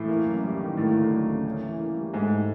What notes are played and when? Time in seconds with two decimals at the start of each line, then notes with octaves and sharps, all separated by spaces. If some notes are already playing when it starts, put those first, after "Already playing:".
Already playing: A2 E3
0.08 A#3
0.26 F#2
0.43 G3
0.60 D#3
0.77 A2 A#3
0.94 D2
1.12 F#3
1.28 C#3
1.46 C#4
1.63 E3
1.79 A#3
1.96 G3
2.13 G#2 A3